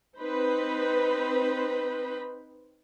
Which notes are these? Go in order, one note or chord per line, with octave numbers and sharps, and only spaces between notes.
C4 D#4 B4 C5 B5